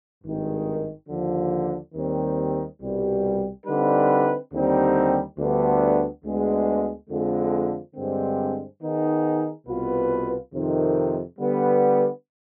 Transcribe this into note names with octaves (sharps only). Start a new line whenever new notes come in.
G#1 G2 D#3 G#3
D#2 D3 F3
D#2 D#3 G3 C4
C2 B2 G3
D3 G3 C4 D#4 B4
D#2 D3 G3 C4 D#4
D2 D3 G3 B3 D4
D2 D3 G#3 B3
F2 D3 F3 G#3
G2 D3 G#3 C4
D#3 B3 D#4 G#4
C2 B2 B3 F4 B4
F2 C3 D#3
D3 G3 B3